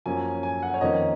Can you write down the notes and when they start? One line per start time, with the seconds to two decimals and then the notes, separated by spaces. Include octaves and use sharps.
0.06 F#2 F3 A#3 C#4 G#5
0.43 G#5
0.63 F#5
0.74 C#5
0.81 F2 D#3 A#3 C#4 D#5